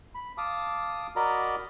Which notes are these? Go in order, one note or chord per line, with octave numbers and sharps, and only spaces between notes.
B5
F5 A5 D6 D#6
F#4 A#4 D5 D#5 A#5 B5